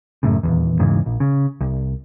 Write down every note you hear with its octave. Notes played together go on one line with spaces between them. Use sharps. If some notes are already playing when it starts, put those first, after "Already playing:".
F#2 A2 C#3
D#1 B1 E2
E2 G#2 C#3 E3
A#1
C#3
C2